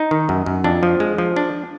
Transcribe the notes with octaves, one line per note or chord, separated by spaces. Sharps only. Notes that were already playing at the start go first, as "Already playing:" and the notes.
Already playing: D#4
D#3
F#2
F#2
F2 D4
F3
G#3
F3
D4